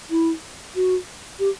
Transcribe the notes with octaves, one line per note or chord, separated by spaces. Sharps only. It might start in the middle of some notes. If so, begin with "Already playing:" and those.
E4
F#4
G4